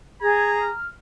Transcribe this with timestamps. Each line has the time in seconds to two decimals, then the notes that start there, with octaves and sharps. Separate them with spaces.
0.22 G#4 A#5 G#6
0.61 F6